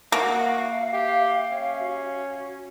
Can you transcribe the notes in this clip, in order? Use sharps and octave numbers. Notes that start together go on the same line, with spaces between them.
A#3 F#4 E5 F5
G4
C#4
F#4